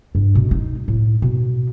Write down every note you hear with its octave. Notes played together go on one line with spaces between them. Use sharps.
G2
B2
D#4
A2
B2